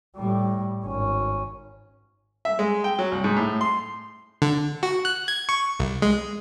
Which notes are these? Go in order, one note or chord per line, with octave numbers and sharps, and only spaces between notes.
A2 G3
G#1 C#4
E5
G#3
G5
F#3
C2
G#2
A2
C6
D3
F#4
F#6
G#6
C#6
C2
G#3